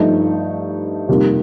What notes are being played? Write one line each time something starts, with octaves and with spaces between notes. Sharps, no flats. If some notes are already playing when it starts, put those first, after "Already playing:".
Already playing: G2 F3 A3 D#4
F2 C3 D#3 G3 A#3